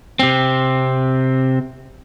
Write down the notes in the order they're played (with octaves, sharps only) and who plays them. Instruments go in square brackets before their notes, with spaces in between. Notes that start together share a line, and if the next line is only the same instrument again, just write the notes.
[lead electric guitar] C3 C4